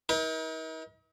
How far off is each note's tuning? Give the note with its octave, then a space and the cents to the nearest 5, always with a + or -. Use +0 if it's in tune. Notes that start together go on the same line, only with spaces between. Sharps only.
D#4 +45 A#4 +40